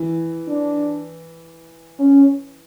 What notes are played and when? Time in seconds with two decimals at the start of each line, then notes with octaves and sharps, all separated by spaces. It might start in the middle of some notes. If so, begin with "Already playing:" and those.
Already playing: E3
0.48 D4
2.00 C#4